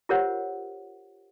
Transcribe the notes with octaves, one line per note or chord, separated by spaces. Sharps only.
F4 G4 A#4 C5 C#5 F#5